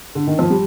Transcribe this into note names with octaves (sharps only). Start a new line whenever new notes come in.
D3
D#3
F3
G3